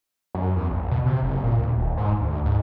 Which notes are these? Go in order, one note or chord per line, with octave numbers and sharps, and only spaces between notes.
F#2
E2
A#1
B2
C3
F#1
A#2
D2
D#1
G#2
D2
G#2